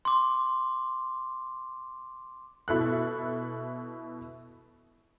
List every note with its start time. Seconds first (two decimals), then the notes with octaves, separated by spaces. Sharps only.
0.05 C6 D6
2.68 B2 E4 A4 F#6